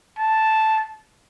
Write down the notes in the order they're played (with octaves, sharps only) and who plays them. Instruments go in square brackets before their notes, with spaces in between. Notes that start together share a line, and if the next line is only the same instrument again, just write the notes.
[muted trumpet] A5